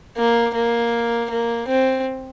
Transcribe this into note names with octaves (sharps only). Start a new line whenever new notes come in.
A#3
A#3
A#3
C4